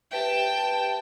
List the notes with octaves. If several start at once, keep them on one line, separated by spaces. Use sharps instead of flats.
G4 B4 E5 G5 A5